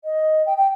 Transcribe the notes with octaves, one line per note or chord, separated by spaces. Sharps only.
D#5
G5
G5